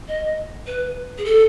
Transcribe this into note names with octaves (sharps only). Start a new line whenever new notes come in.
D#5
B4
G#4
A4